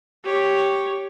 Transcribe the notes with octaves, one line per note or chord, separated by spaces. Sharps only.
G4 C#5